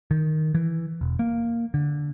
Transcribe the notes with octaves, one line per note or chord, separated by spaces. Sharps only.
D#3
E3
E1
A#3
D3